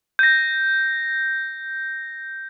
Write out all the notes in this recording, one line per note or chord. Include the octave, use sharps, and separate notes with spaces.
G6 A#6